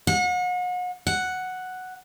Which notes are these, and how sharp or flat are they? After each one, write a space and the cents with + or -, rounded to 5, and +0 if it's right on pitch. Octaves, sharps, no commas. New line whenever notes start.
F#5 -40
F#5 +0